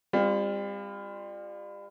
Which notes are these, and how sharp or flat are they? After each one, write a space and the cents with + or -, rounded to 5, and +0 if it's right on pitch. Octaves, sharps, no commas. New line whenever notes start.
G3 +35 C4 +0 F4 +0